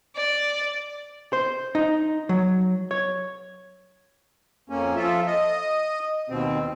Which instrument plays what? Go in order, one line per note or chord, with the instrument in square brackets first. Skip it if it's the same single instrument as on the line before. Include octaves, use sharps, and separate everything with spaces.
[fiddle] D5
[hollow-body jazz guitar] C5
D#4
F#3
C#5
[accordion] F2 A#3 C#4
F3 F4 A4 E5
D#5
D#2 B2 C4